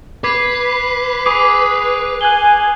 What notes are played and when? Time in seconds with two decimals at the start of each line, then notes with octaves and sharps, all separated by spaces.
0.24 B4 D6 G#6 C7
1.26 G#4 D6 D#6 F7
2.21 G#5 F#6 F#7 G7